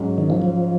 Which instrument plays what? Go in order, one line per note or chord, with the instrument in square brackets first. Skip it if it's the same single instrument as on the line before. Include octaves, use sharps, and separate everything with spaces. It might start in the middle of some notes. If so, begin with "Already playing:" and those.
Already playing: [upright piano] G#2 F#3 C#4
[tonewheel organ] D#3
F3
F3